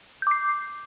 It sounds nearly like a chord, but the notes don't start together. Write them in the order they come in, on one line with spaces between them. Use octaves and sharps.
G6 D6 C7